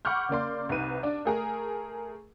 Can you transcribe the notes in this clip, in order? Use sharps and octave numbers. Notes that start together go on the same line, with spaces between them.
F#5 B5 C#6 D6 F6 G6
C#3 A#3 D5 C6
C2 C3 D#4 B4 D#7
D4 D5
A3 G#4 A#4